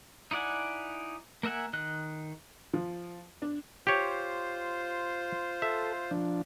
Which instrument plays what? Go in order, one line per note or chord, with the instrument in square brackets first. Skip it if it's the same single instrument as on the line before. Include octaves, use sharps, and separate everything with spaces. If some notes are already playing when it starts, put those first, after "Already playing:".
[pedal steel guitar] D#4 E4 D5 F#5 G#5
A#3 A#4 E5 F#5 G#5
D#3 D#5 F#6
[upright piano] F3
D4
[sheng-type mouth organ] F4 C5 [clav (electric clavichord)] G4 C#5
[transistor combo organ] A4 [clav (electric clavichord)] E5
[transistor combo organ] F3 D4